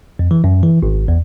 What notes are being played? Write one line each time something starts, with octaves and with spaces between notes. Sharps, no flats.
F2
E3
F#2
E3
G#1
E2